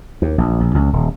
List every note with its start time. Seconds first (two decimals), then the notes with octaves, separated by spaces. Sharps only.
0.22 D#2
0.38 A#1
0.60 A#1
0.75 C#2
0.93 D#1